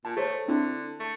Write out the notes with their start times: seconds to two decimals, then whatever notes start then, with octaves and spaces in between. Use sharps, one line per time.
0.05 A#2 A5
0.17 A3 G#4 C5 C#5
0.48 D3 C4 D4 E4
1.00 A3